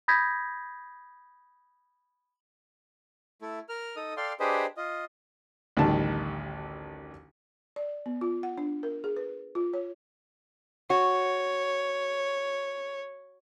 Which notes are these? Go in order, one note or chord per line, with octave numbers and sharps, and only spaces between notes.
B5 D#6 G6 G#6 A#6 B6
A3 E4
A#4 F6
D#4 A4 D#6
A4 D5 F5 G5 C6
D4 G4 G#4 B4 C5 D#5
F4 D#5
A1 D2 D#3 G3 A5
D5
B3
F4
F#5
D4
A#4
G#4
B4
F4
C#5
F#4 C#5